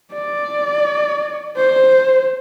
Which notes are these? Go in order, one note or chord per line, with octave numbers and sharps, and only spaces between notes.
D5
C5